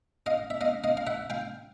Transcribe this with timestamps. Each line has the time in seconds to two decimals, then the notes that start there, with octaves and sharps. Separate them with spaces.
0.26 D#5 F5
0.50 E5
0.61 D#5 F5
0.84 D#5 F5
0.97 F5
1.07 E5 F#5
1.30 F5 G5